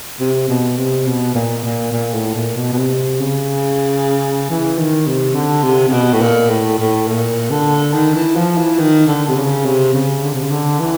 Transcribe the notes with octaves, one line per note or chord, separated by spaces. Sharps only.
C3
B2
C3
B2
A#2
A#2
A#2
A2
A#2
B2
B2
C3
C#3
E3
D#3
C3
D3
C3
C3
B2
A2
A#2
A2
A2
A#2
D3
D#3
E3
F3
E3
D#3
D3
C3
C#3
C3
C#3
D3
C3
C#3
D3
E3